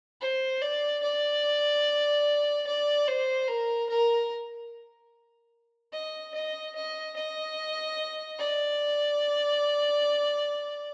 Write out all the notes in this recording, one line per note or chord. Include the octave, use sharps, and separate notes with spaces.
C5
D5
D5
D5
C5
A#4
A#4
D#5
D#5
D#5
D#5
D5